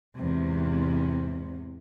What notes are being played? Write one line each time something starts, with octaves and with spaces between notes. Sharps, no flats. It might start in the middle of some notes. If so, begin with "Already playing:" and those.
E2 G#2 C3